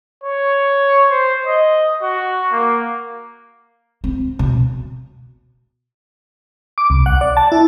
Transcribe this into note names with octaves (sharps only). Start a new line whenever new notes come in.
C#5
C5
D#5
F#4
A#3
C4
B2
D6
C2
F#5
D5
A5
E4